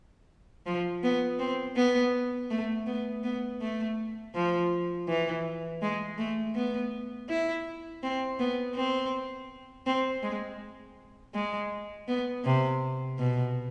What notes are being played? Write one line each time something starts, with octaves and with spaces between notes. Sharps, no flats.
F3
B3
C4
B3
A3
B3
B3
A3
F3
E3
G#3
A3
B3
E4
C4
B3
C4
C4
G#3
G#3
B3
C3
B2